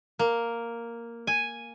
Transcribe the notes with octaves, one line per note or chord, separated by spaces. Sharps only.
A#3
G#5